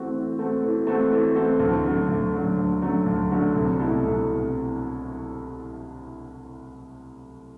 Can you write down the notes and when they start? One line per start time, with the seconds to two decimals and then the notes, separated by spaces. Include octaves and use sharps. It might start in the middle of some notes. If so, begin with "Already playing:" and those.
Already playing: E3 A3 C4 F#4 A4
0.13 E3
0.39 A3 C4 F#4 A4
0.63 E3
0.87 A3 C4 F#4 A4
1.11 E3
1.35 A3 C4 F#4 A4
1.60 D2
1.85 D3 F#3 A3
2.08 D2
2.33 D3 F#3 A3
2.58 D2
2.82 D3 F#3 A3
3.06 D2
3.31 D3 F#3 A3
3.55 C2
3.80 B2 A3 E4 A4
4.04 C2